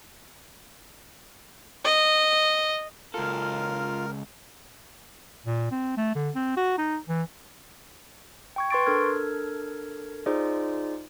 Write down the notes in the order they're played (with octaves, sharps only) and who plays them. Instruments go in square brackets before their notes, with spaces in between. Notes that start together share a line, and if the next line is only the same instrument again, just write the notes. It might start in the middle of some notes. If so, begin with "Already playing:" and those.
[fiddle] D#5
[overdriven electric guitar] C#2 A4 [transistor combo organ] F4 [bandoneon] A#4
[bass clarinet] A#2
C4
A3
D3
C4
F#4
D#4
E3
[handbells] G5 C#6 G#6
B4 C6 C#6 A6 D7
D4 A4 A#4 F6 G#6
D#4 F4 G#4 C5 D5